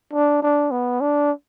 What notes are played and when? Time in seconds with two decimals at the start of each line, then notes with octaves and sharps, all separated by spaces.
0.13 D4
0.42 D4
0.71 B3
1.01 D4